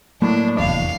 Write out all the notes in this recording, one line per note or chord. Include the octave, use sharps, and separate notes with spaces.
A2 F#3 A#3 D4
F1 E2 F5